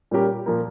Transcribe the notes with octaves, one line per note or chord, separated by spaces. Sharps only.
A#2 G3 C#4 G4 A#4
A#2 F3 A#3